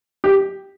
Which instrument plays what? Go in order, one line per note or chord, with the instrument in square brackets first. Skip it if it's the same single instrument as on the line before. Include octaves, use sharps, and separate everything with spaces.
[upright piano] G4